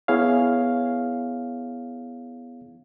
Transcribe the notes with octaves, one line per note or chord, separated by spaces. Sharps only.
B3 E4 G#4 C#5 F5